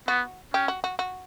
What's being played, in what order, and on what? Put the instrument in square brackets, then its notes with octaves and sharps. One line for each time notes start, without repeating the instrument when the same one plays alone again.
[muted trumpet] B3 [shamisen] F#4
[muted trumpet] C#4 [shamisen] G4
[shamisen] F#4
F#4
F#4